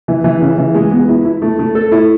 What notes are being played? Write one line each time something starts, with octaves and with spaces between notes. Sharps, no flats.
E3
E3
C#3
E3
G#3
B3
E4
E4
A3
A3
A4
E4